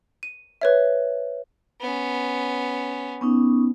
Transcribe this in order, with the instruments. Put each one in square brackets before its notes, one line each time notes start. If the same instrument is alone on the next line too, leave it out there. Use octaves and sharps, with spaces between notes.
[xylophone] D#7
B4 C#5 E5
[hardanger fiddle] B3 C#4
[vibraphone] B3 C#4 D#4